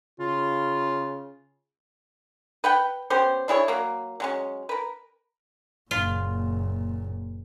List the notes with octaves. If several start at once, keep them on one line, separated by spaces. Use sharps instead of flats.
C#3 F4
B4 F#5 G5
B3 C#4 G4 C5
D4 E4 G#4 C#5
F#3 A#3
F#3 G#3 C#4
A#4 B4
F#1 A#2 F4